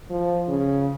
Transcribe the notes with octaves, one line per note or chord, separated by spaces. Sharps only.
F3
C#3